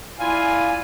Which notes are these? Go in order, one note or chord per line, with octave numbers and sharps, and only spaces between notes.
E4 F4 D5 F5 G#5